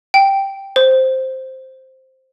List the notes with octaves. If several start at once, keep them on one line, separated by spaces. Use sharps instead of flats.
G5
C5